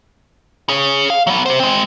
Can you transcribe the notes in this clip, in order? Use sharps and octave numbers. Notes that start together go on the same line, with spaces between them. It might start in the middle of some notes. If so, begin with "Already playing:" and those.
G#4 C#5
F5
F#3 B3
G4 C5
G#3 C4